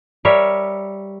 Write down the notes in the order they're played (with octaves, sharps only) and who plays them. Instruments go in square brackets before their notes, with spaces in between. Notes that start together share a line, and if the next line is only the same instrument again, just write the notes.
[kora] G3 A#4 C#5 E5